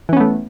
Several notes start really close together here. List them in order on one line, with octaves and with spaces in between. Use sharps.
E3 C#4 B3 A3